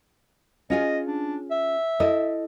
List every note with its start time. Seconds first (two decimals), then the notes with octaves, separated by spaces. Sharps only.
0.70 C#4 F4 G#4 D#5
1.06 D4
1.51 E5
2.00 E4 A4 D#5